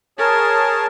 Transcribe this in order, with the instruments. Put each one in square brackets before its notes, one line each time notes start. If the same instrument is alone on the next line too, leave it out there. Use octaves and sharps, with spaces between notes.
[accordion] G#4 C#5 A5 [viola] A#4